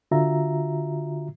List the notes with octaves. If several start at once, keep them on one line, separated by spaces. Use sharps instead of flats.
D3 F4 F#4 E5 A#5